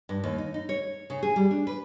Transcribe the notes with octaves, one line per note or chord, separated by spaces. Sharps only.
G2
D#2
D#4
D#4
C#5
C#3
G#4
G3
D4
B4